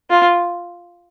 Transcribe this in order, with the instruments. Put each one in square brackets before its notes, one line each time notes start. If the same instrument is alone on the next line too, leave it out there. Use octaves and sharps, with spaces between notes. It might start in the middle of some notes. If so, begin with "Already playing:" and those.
[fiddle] F4